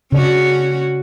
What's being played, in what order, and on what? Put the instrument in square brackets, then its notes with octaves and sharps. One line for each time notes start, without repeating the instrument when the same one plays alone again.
[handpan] C#3 D5 [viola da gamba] C#4 F#4